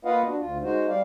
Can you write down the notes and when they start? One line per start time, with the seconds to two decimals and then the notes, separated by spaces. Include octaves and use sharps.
0.05 A#3 F4 B4 D#5 F5 F#5
0.26 D4 F#4
0.40 D2 F4
0.63 G#3 D#4 F#4 C5
0.89 G3 D5 F5